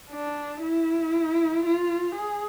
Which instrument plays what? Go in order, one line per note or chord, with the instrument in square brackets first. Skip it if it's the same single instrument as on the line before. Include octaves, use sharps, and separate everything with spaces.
[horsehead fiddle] D4
E4
F4
G#4